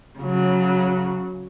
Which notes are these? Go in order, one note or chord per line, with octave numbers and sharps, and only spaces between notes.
C#3 F#3